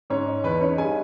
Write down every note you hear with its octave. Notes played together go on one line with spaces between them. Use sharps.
G#2 C#4 C#5
D#4
E2 B4
C#4 D#4 C#5
G2 G#4 G#5